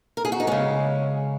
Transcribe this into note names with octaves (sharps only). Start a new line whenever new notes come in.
A#4
G#4
F#4
D#4
C#3 G#3 C#4